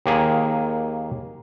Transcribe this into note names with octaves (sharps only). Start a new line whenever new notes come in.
D#2 A#3 G#4